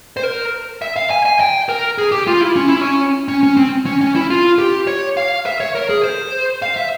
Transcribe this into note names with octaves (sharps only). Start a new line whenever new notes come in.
C5
A#4
E5
F5
G#5
G#5
G5
A#4
G#4
G4
F4
E4
C#4
E4
C#4
C#4
C#4
C4
C#4
C#4
E4
F4
G4
C#5
F5
E5
C#5
A#4
G#4
C5
F5
E5